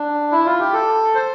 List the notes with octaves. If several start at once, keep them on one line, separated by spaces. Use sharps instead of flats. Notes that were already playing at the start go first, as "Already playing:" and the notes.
Already playing: D4
E4
F4
G4
A4
C5